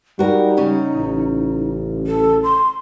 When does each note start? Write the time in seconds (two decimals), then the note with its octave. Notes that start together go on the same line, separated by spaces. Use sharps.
0.19 G3 D#4 F#4 A#4
0.57 C#3 C#4
0.94 A1
2.07 A4
2.44 C6